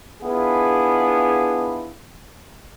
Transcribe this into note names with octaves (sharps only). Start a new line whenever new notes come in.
B3 D4 E4 F4 G#4